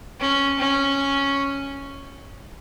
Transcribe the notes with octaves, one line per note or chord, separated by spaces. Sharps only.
C#4
C#4